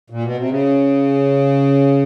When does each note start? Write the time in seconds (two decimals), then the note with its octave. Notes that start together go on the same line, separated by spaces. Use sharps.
0.10 A#2
0.23 B2
0.36 C3
0.49 C#3